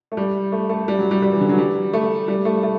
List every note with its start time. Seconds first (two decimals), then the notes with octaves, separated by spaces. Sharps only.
0.12 A3
0.17 G3
0.52 A3
0.70 A3
0.88 G3
0.99 F#3
1.11 G3
1.22 G3
1.32 E3
1.41 D3
1.49 F#3
1.58 G3
1.93 A3
2.28 G3
2.45 A3
2.63 A3